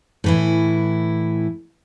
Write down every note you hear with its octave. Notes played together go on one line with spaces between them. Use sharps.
A2 E3 E4